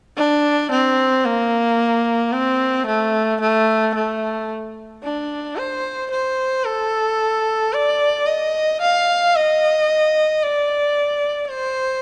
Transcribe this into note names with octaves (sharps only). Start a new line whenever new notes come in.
D4
C4
A#3
C4
A3
A3
A3
D4
C5
C5
A4
D5
D#5
F5
D#5
D5
C5